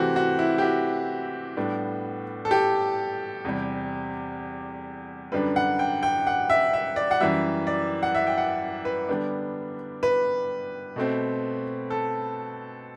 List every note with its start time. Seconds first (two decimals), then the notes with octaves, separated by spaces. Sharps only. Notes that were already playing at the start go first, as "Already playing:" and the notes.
Already playing: C3 E3 A3 C4 F#4 G4
0.16 F#4
0.39 E4
0.58 G4
0.62 F#4
1.57 A2 G3 B3 D4
2.45 A4
2.51 G4
3.45 E2 C3 G3
5.32 F#2 D3 G3 D4 B4
5.56 F#5
5.79 G5
6.03 G5
6.27 F#5
6.50 E5
6.73 E5
6.96 D5
7.11 F#5
7.20 F#2 E3 G3 E5
7.67 D5
8.03 F#5
8.15 E5
8.27 G5
8.38 F#5
8.85 B4
9.08 D3 G3 B3 D4
10.03 B4
10.96 B2 A3 C4
11.90 A4